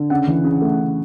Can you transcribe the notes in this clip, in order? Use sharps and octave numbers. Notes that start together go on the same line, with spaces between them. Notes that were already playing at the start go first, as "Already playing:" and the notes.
Already playing: D3
C#3 F#5
E3
C#3
A3
C#3